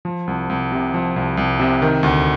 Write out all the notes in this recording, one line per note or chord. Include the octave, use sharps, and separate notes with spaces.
F3
C2
C2
C3
F3
C2
C2
C3
D#3
D2